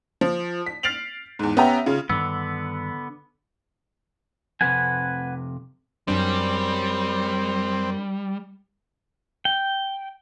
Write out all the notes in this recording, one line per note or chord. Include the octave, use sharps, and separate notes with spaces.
F3
B6
F6 A6 C7 D7 F7 F#7
E2 G#2
B3 C#4 G4 E5 G5 A#5
C#3 F4
G2 D3 D#3 G3 B3 E6
F2 C3 B4 F#5 G#5
F#2 G3 C4 D4
G5